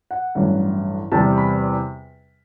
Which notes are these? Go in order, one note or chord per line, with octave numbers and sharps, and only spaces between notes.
F#5
A1 G2 F#3
E2 C3 G3 A5
B5